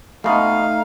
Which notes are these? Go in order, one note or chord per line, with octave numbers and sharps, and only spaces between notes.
G#2 B2 A3 D#4 F5